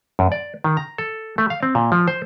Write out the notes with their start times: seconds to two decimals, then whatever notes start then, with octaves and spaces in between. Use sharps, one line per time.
0.19 F#2
0.32 D5
0.64 D#3
0.77 A#5
0.98 A4
1.38 A3
1.50 F5
1.63 C4
1.75 A#2
1.92 F3
2.08 C5